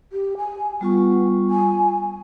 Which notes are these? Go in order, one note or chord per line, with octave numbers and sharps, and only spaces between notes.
G4
G#5
G3 B3 F4 C#6
G#5